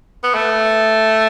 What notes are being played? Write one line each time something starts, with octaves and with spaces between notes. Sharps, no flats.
B3
A3